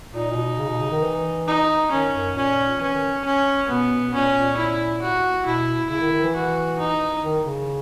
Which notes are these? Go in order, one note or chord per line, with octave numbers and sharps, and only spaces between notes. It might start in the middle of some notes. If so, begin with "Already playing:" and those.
A#2 D#4
A#2
B2
C#3
B2
C#3
D#3
E3
D#4
D#3 C#4
F#2
A#2 C#4
E3 C#4
D#3
C#4
B2 B3
B2
A#2 C#4
A#2
E4
F#4
B2 E4
C#3 E4
D#3
D#3
E3
F#4
D#4
D#3
C#3